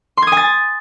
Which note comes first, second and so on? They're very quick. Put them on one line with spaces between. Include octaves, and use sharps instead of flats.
C6 G#6 D#6 G#5 A6